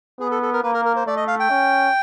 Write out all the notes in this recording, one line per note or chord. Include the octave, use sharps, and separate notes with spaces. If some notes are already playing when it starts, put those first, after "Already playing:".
B3 G#4
A4
A4
A#4
A#3 B4
A#4
A#4
C5
A3 D5
D#5
F5
G5
C#4